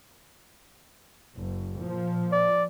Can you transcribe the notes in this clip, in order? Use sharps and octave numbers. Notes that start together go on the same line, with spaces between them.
F#1
A#2 F3
D5